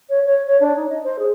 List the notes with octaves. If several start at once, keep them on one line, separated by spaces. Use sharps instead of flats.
C#5
C#5
C#5
D4
D#4
D#5
C5
G#4